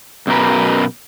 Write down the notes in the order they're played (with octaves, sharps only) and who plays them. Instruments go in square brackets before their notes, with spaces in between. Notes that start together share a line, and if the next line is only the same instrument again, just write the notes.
[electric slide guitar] F#2 B2 A#4 B4